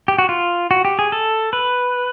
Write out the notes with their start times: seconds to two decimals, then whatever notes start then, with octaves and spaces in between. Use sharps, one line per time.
0.08 G4
0.18 F#4
0.29 F4
0.71 F#4
0.85 G4
0.99 G#4
1.12 A4
1.53 B4